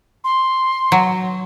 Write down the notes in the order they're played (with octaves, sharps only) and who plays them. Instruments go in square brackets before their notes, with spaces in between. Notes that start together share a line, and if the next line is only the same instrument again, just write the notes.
[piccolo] C6
[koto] F#3